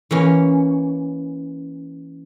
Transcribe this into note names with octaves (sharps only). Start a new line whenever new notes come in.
E3 A#3 C#4